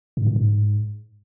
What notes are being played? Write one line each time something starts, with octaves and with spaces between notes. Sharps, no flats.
G#2
A2
G#2